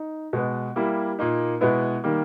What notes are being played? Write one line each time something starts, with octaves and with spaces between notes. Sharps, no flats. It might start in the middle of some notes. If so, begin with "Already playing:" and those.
Already playing: D#4
B2 G#3 B3
G3 A#3 E4
A#2 A#3 D#4
B2 G#3 B3 E4
D#3 G3 A#3